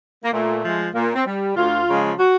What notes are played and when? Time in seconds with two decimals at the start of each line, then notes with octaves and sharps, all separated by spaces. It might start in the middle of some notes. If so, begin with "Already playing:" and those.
0.24 A#3
0.33 A#2 A3
0.64 F3 G#3
0.94 A#2 A#3
1.15 C4
1.26 G3
1.56 D2 F4
1.88 C#3 F3 G#3
2.19 F#4